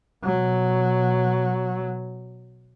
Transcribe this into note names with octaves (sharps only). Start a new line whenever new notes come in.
B2 F#3